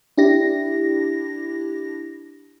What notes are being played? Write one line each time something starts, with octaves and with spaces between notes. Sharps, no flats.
D4 E4 G4 A#6